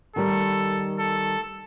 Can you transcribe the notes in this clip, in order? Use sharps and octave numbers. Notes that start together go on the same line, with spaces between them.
D#3 G3 A4
A4